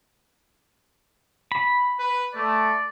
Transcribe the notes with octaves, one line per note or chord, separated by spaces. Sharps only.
B5
B4
A3 D5